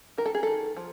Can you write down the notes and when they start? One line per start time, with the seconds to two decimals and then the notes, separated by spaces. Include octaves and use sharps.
0.18 D#3 A#4
0.26 A4
0.35 G#4
0.43 D#3 A4
0.77 F3